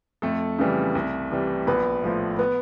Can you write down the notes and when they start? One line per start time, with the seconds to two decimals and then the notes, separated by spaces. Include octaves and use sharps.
0.22 F2 A3 A4
0.59 C#3 E3 G3
0.95 C2
1.31 C3 E3 G3
1.67 A#1 B3 B4
2.03 A2 F3
2.39 B3 B4